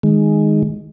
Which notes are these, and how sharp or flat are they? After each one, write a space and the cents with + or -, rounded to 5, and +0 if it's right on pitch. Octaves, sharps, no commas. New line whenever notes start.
D#3 +0 G#3 +0